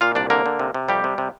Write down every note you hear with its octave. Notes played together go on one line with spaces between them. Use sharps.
A#2 F4 F5
C2 D4 D5
D3 A#3 A#4
D3
C3
C3
F2 G3 G4
C3
C3